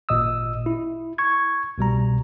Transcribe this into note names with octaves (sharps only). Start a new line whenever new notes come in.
G#1 A#2 D#5 D#6 E6
E4
C#6 G#6
C2 B2 G3 A#5